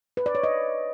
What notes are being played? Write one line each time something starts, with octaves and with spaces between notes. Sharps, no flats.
B4
D5
C#5
D#5